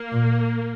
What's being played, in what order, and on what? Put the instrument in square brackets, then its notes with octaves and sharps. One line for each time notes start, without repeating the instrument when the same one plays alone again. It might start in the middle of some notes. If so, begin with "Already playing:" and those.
Already playing: [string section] A#3
[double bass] A#2